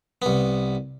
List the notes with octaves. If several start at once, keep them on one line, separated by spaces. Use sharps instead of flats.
C2 B3